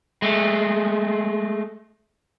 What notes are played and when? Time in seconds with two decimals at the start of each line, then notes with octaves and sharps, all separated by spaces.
0.22 G#3 A3